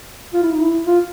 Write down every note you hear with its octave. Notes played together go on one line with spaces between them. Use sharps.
F4
E4
D#4
E4
F4